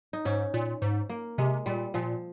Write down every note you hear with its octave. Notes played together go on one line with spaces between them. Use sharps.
D#4
G#2 C#4
A#2
G#2
A#3
C3 G#3
A#2 G3
A#2 F3